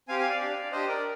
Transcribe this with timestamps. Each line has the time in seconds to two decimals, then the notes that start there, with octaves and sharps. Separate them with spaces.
0.08 C4 G4 F5 G#5
0.19 F5 G#5
0.29 D5 F5
0.40 D4 G4
0.71 D4 G4 C5 D#5
0.88 A#4 D5